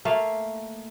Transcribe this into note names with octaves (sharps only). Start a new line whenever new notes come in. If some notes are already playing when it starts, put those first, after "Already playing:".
A3 A#3 F5